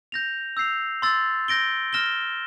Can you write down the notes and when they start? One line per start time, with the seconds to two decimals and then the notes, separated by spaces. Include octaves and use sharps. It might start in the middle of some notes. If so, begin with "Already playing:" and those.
0.12 G6 A#6 F7
0.57 E6 G6 C7 F7
1.02 C6 E6 A6
1.48 G6 A#6 D7 G7
1.93 F6 A#6 E7 G7